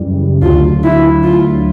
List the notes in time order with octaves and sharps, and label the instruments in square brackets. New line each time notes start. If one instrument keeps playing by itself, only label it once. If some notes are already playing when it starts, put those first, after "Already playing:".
Already playing: [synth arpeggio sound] F#2 C#3 E3 G3
[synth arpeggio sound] D2 D3 F#3 [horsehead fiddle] F4
[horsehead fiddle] E4
F4